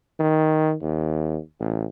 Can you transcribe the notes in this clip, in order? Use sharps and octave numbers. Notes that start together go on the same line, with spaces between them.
D#3
D#2
A1